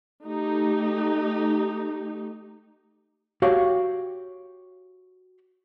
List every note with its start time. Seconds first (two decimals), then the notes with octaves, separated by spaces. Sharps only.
0.23 A3 D#4 G4
3.42 F#4 G4 C#5 F5